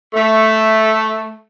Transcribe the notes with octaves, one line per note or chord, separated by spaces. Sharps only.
A3